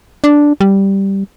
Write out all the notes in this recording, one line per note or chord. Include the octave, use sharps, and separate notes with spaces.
D4
G3